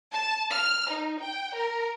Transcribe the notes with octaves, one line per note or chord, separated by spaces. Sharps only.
A5
F6
D#4
G5
A#4